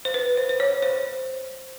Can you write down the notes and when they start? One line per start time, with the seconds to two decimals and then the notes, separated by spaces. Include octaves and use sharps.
0.05 C5
0.14 B4
0.37 C5
0.49 C5
0.60 C#5
0.82 C5